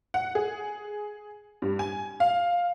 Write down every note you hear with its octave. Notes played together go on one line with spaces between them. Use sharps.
F#5
G#4
G2
G#5
F5